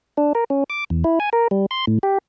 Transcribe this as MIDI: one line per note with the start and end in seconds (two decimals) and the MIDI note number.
0.17 0.33 62
0.35 0.44 70
0.50 0.64 61
0.70 0.84 86
0.90 1.04 40
1.04 1.19 64
1.20 1.30 80
1.33 1.48 70
1.51 1.66 55
1.71 1.85 84
1.87 1.98 45
2.03 2.18 67